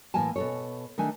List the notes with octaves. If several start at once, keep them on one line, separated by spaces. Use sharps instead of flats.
A2 E3 A#3 A#4 G#5 A5
B2 A4 C#5
D#3 A3 D4 G#5